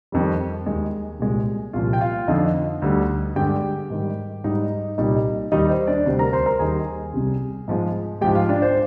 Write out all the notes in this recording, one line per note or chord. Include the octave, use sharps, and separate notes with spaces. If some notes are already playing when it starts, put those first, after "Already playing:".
F2 D#3 G3
D#2 D#3 G#3
C2 A#2 G#3
C2 A#2 F3 F4 F5
G5
F4 F5
F2 D3 F3 D#4 D#5
D2 D3 G3
G2 D3 G#3 G4 G5
G#2 D#3 G3
G#2 G3 D#4 D#5
C2 A#2 G3 D#4 D#5
D#2 D#3 G3 D#4 D#5
C5
D4 D5
D2 C3 G3 C5
A#4 A#5
C5 C6
A#4 A#5
D#2 D#3 G3 G#4 G#5
C2 C3 G3
G#2 F3 G#3
G#2 F3 G#3 G4 G5
F4 F5
D4 D5
C5